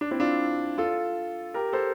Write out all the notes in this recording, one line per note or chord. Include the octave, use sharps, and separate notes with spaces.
D4
C4 E4
D4 F4
F4 A4
G4 A#4
A4 C5